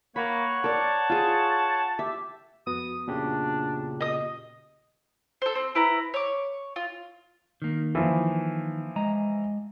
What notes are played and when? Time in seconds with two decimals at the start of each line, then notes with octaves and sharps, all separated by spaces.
0.16 A#3 C#5 F#5 B5 C#6
0.64 A#4 D5 A5
1.09 F4 G#4
1.99 G4 E5
2.67 F2 B3 F#4 D#6
3.07 A#2 C#3 D4 G4
4.01 D#5 D#6
5.42 A4 C5
5.55 C4
5.75 E4 B4 A#5
6.14 C#5 D6
6.76 F4
7.62 D#3 A#3
7.95 E3 F3
8.96 G#3 D#5 A#5